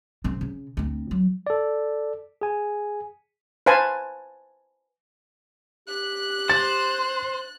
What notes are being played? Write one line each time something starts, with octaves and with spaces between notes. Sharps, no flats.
C#3 C4
C#3
D2 C4
F#3
A4 D5
G#4 G#5
B4 C5 F5 G#5 A5
G4 F#6
C5 A6